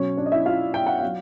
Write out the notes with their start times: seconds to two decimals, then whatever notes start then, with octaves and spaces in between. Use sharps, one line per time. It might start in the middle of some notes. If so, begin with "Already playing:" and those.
Already playing: B2 F#3 C#4 C#5
0.17 D4 D5
0.26 D#5
0.32 E4 E5
0.45 F4 F5
0.74 G5
0.86 F#5
0.98 F#3 F5